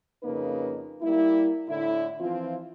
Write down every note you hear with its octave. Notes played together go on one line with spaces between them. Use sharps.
F2 C#3 A#3 D#4 B4
G3 A#3 E4
A2 D3 E4
E3 F3 C4 F4